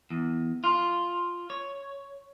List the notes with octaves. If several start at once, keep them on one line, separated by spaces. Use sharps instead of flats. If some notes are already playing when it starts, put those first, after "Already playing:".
E2
F4
C#5